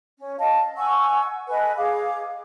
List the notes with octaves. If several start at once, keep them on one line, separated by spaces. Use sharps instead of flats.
C#4
D#5 F5 A5
F#5 G#5 C#6 E6
A4 B4 D#5 G#5
G#4 F5 D6